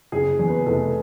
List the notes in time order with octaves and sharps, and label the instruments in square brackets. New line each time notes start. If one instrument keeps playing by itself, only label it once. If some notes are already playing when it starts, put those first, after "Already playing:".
[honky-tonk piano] F#1 [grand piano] G#4
[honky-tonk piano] E2
[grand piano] B4
[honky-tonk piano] F1 [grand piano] A4